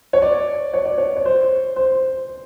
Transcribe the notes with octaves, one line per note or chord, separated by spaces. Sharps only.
C#5
D5
C#5
D5
C#5
C#5
C5
C5